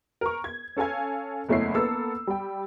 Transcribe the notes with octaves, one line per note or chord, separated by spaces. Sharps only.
A#4 C#6
G#6
C#4 A4 F5 G#5 G#6
F#1 E2 A3 E4 C#5 C7
A#3 B3 A4 E6
G3 G5